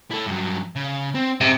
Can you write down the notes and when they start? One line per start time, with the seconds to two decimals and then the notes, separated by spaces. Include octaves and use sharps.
0.11 A3 E4
0.26 G2 F#3
0.76 C#3
1.15 C4
1.41 G#2 C3